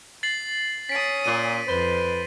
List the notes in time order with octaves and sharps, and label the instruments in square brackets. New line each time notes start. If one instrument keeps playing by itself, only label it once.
[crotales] A6 C7 F#7
[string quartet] C#4 D#6 [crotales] B6 D7
[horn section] A#2 [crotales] D#7
[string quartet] F2 [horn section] B4 C5